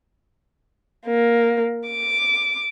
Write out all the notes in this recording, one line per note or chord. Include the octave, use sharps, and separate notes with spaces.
A#3
D6